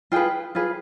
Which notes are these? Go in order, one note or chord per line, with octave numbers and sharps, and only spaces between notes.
F4 G#4 B4 G5
F4 G#4 B4